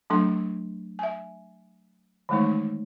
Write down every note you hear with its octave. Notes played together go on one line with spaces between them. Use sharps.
F#3 A3 D4 A4 C6
E5 G#5
D#3 E3 G#3 A3 D#4